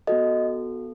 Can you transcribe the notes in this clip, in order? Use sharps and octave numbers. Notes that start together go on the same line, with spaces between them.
B3 F#4 A4 D#5